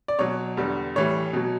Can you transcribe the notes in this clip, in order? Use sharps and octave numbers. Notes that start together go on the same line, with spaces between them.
D5
B2 F#3 C#5
E2 D3 G3
A2 E3 G3 C#5
B2 F#3